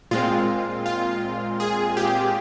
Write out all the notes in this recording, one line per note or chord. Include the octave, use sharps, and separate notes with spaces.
A#2 G#3 C4 F4
F4
G#4
G4